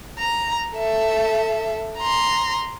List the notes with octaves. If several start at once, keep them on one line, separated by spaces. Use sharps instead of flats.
A#5
A4 E5
A#5 C6